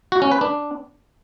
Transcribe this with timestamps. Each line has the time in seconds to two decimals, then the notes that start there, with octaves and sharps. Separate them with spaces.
0.12 F#4
0.22 C#4
0.32 B4
0.41 D4